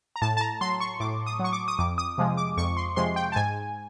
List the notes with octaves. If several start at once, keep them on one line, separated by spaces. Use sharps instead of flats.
A#5
A2 A5
A5
A#5
F#3 C6
C#6
A2 D6
D#6
F#3 C#6
D6
D#6
F2 D6
D#6
C3 F3 G#3
D6
F2 C#6
C6
C3 F3 G#3 C6
G5
A5
G#2 G#5